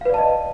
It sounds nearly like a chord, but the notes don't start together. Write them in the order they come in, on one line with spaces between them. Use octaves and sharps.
F5 B4 D5 A5 D#5